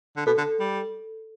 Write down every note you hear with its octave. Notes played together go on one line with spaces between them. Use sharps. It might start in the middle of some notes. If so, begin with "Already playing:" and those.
D3
B2 A4
D3
G3